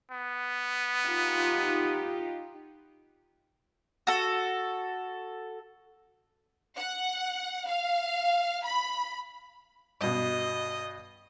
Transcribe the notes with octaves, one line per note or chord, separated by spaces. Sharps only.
B3
D#4 F4 G4
F#4 A4
F#5
F5
B5
G2 B2 D#5